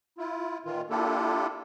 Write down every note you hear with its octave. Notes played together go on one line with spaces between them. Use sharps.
E4 F4
A#2 D#3 E3 F4
A#3 D4 E4 F4 G4 A4